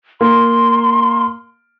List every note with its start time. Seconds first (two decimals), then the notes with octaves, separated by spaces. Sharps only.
0.21 A#3 C6